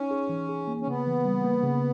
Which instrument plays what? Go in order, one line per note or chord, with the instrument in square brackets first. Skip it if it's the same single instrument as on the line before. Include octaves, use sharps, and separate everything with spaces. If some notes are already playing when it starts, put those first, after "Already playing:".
Already playing: [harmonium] C#4 [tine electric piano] D#4
[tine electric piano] G#4
E3
G#4
A#3
[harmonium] C#4
[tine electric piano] C#3 [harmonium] B3
[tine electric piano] E3
G3
A#3
C#3